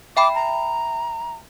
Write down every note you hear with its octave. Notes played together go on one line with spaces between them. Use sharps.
E5 G5 B5 D6
A#5